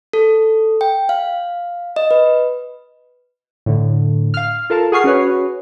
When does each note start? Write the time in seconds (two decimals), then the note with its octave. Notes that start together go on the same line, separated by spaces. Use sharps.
0.13 A4
0.81 G5
1.09 F5
1.96 D#5
2.11 B4
3.66 A2 D3
4.34 F5 F6
4.70 F4 A4 A#4 F5 A5
4.92 G#4 F#5 G#5 C#6 F6 C7
5.04 C#4 F#4 G#4 B4 C#5